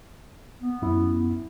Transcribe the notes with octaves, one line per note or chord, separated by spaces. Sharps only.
B3
F#2 E4